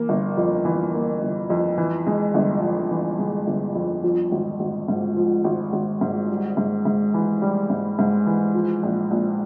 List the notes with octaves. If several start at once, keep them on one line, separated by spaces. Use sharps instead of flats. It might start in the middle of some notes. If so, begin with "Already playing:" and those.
Already playing: E3 A#3
G1
F2
E3
A#3
G1
F2
E3
G#3
G1
F2
E3
G#3
G1
F2
F3
G#1
G#1
G#2
F3
G#1
G#1
G#2
G3
G#2
G#2
E3
G3
G#2
G#2
E3
F3
A#1
A#1